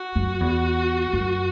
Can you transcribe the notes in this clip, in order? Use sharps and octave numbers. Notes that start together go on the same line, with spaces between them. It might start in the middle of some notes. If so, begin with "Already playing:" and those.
Already playing: F#4
F#2
E2
F#2